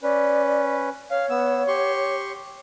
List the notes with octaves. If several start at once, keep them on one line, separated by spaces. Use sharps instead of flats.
C#4 B4 D5
C#5 F5
B3 E6
G4 C6 C#6